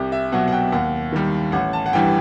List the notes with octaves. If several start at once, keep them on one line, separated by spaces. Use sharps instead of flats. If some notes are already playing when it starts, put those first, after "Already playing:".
Already playing: C2 G4
E5
B2 F#3 F#5
F#5
G5
D#2 F#5
D#3 G3
A1 F#5
A5
F#5
G2 E3 G3 G5